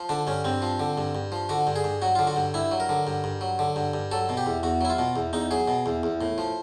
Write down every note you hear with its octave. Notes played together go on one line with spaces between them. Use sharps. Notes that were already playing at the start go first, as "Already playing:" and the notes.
Already playing: F3
D3 D4
G2 C#4
G2 C4
F3
D3
G2
G2
F3
D3 F#4
G2
G#4
G2
F#3 F#4
D3 F4
F#4
G2
G2 E4
F#3
A#4
D3
G2
G2
F#3
D3
G2
G2
F#3 A4
B2
G4
E2
E2 F#4
F#3 E4
F4
B2
E2
E2 D#4
F#3 G#4
B2
E2
E2
A2
F3